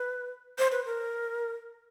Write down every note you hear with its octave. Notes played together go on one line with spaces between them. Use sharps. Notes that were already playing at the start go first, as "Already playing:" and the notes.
Already playing: B4
C5
B4
A#4